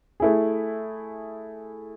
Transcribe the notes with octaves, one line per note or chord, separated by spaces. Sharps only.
A3 E4 G#4